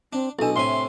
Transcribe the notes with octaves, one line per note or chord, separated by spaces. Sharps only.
C4 D4
B1 D4 E4 A4 D#5
A2 C3 E5 G#5 C6